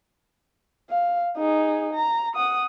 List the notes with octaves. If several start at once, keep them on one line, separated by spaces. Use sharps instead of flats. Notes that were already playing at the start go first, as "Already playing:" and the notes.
F5
D#4 G#4
A#5
F#5 D#6